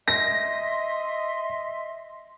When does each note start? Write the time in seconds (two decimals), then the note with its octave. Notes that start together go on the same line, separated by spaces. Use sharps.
0.08 D#5 E5 C6 A#6